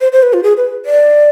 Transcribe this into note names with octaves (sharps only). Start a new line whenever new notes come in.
C5
C5
B4
F4
G#4
B4
D5